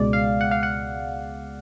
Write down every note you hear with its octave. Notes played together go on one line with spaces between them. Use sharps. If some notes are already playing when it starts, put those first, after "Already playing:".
Already playing: C#2 B2 G#3 D5
F5
F#5
F5
F#5